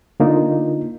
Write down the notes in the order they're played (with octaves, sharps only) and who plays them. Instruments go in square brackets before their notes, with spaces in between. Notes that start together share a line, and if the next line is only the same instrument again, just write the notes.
[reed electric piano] D3 A#3 D#4 F4